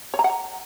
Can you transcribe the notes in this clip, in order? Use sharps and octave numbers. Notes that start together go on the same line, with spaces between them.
C#5
A#5
F#5
A#5